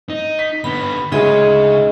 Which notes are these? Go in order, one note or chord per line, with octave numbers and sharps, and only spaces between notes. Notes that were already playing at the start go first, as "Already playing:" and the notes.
D#4
B6
D3 B3 B5
D2 C#3 G#3 C#4 D#4 G#4 D#5